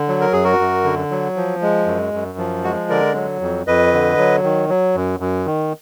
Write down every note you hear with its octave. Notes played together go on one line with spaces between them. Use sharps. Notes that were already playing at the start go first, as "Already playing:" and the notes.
Already playing: D3
F#3
A#4
F#2 G#4
F#4 A#4
F#2
D3
F#3
F3
G#3
F#2
F#2
F3
G#3 F#4
D3 A#4 D5
F#3
F2
F2 B4 D#5
D3
F#3
D#3
F#3
F#2
F#2
D#3